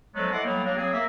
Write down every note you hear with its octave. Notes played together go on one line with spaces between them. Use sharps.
D3 F3 F#3 G#3 A3 B3
E4 A4 D#5 F#5 C6 D6
A2 F#3 G3 A#3 B3 G5
F#3 A#3 D4
C#3 F#3 C4 G#4
A#3 E5